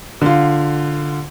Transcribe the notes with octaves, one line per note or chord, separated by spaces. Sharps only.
D3 F4